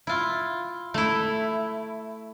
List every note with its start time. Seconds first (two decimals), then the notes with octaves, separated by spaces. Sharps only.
0.07 E4 F4
0.94 A3 E4